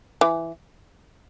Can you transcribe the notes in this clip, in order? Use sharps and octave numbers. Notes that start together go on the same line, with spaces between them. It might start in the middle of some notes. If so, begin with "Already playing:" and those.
E3